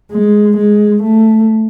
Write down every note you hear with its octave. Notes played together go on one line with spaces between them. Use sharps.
G#3
G#3
A3